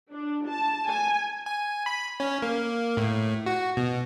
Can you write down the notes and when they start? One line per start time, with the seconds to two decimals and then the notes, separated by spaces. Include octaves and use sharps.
0.12 D4
0.47 A5
0.86 G#5
1.46 G#5
1.86 B5
2.20 C#4
2.42 A#3
2.97 A2
3.46 F#4
3.77 B2